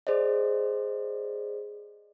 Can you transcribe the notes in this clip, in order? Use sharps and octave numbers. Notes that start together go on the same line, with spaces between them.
G#4 C5 D5 D#5